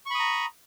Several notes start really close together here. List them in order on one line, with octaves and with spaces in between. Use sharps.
C#6 B5 D#6 A#5